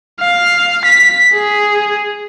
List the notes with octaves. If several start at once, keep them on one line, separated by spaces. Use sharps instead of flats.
F5
B6
G#4